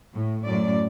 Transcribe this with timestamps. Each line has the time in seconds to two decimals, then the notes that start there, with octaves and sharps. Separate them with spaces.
0.13 A2
0.46 F#2 A2 D5